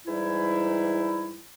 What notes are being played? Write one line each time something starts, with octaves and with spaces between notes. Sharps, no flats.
G#2 E3 G3 D#4 E4